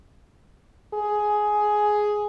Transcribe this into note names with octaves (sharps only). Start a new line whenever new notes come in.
G#4